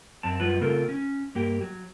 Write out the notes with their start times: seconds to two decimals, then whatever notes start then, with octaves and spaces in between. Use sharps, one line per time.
0.23 F#2 C4 A5
0.40 F#2 G3 F4 B4
0.61 C#3 A3 C4 F4 A4 A#4
0.89 C#4
1.35 G2 A#3 G4
1.61 F#3